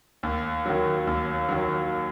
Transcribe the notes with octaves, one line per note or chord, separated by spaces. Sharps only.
D#2
D#3 F#3
D#2
D#3 F#3